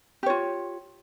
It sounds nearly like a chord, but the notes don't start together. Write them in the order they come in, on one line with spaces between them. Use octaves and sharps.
G4 C#5 F4